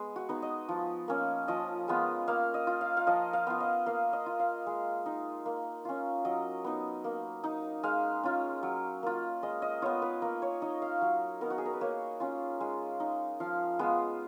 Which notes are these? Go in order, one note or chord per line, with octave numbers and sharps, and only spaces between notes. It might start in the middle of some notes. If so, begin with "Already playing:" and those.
Already playing: G#3 B3
F#4
B3 D#4
D#5
F3
A#3 C#4
F3 D#5
G#3 B3 F4
A#3 F5
D#5
F4
F5
F5
F3 D#5
F5
B3 F4
D#5
A#3 F5
D#5
F4
F5
G#3
D#4
A#3
C#4 F4
F#3 D#5
B3 D#4
A#3
D#4
G#3 F5
C#4 F4
F#3
A#3 F4
G#3 D#5
D#5
B3 F4 C#5
B4
A#3 A#4
C#5
D#4 D#5
F5
F#3
B3 D#4 A#4
F#4
G#4
A#4
B4
A#3 C#5
C#4 F4
G#3
D#4
F3 F5
G#3 B3 F4